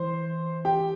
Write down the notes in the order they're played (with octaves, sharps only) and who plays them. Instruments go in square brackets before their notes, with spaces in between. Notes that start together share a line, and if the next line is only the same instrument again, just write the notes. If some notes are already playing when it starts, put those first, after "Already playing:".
Already playing: [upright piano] E3 [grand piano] C5 C6
[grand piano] G4 G5